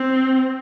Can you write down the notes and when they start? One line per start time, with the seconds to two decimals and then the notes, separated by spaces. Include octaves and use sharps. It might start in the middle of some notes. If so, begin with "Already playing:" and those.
Already playing: C4